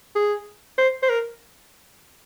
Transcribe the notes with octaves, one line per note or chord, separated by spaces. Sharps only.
G#4
C5
C5
A#4